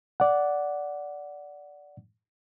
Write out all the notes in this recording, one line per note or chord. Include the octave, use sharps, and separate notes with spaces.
D5 F#5